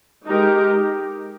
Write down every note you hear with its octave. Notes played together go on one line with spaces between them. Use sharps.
G#3 D#4 G4 A#4